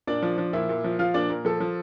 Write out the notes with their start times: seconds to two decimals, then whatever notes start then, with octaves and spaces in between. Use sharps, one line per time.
0.07 A#2 D4 D5
0.22 F3
0.38 F3
0.53 A#2 E4 E5
0.69 A#2
0.84 F3
0.99 F3 F4 F5
1.14 A#2 D4 D5
1.30 A#2 A#4
1.45 F3 A4
1.60 F3